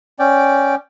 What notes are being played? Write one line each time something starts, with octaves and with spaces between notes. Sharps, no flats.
C#4 D5 G5